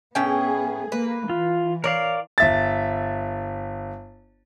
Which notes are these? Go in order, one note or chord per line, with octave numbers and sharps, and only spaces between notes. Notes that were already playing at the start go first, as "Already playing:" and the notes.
A2 B3 C#4 G#4 G5
A#3 B4
E3 F4
A#4 C#5 D5 F5
G1 E5 A6